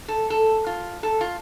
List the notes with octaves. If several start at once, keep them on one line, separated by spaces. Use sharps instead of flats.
A4
A4
F4
A4
F4